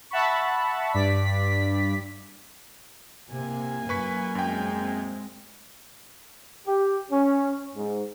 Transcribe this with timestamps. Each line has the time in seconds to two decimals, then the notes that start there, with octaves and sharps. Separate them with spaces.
0.11 E5 F#5 A5 B5 C#6
0.93 G2 D5 B6
3.32 C3 A#3 G#5
3.89 F#2 B4 C#6 B6
4.35 F#2 G#3 C4 G5
6.67 G4
7.11 C#4
7.76 G#2